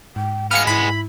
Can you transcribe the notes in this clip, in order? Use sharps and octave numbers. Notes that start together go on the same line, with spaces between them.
G#2 G5
G#3 B3 F5 F6 C#7
G#2 E4 B5